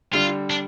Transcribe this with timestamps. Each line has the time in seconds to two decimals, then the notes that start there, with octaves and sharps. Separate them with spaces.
0.13 D3 G3 F4
0.50 D4